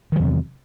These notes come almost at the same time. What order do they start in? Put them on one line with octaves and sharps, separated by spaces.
D#3 F#3 E2 C3